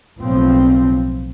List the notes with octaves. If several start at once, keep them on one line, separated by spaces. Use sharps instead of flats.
B1 A2 F3 C4